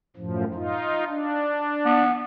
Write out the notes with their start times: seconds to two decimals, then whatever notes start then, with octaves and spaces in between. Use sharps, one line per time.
0.16 F#2 A2 F3
0.54 D#4 F4
1.07 D4
1.85 B3